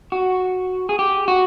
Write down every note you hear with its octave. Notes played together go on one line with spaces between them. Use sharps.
F#4
G#4
G4
F#4